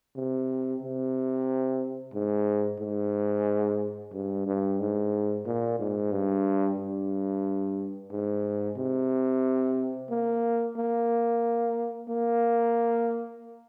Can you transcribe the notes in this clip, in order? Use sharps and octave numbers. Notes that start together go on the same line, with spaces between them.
C3
C3
G#2
G#2
G2
G2
G#2
A#2
G#2
G2
G2
G#2
C3
A#3
A#3
A#3